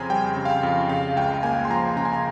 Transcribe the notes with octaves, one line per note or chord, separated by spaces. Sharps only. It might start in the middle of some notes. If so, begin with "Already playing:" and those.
Already playing: F2 C#3 C4 G#5 A#5 C6
G3 G5
C#3
F5
G5
F2
C#3 F5
C#2 G5
A#3 G#5
C6
F3 A#5
C#3 A#5
G#5
A#5